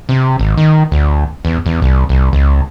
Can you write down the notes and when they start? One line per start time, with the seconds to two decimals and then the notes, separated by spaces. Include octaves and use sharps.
0.09 C3
0.39 G#1
0.57 D#3
0.92 D2
1.45 E2
1.66 E2
1.82 C2
2.09 C2
2.33 C#2